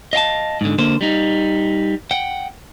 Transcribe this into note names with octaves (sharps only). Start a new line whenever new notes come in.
D#5 F5 G5 A5
G#2 D3
D3 A#3 C5
G3 D#4
F#5 G5